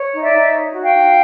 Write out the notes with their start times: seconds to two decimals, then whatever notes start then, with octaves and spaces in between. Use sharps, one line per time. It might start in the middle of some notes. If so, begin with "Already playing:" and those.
Already playing: C#5
0.13 D#4
0.24 D5 E5
0.33 D#4
0.53 C#5
0.74 F#4
0.83 F5 G5
0.93 D#4